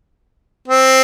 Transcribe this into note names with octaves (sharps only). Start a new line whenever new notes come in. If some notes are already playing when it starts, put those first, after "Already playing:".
C4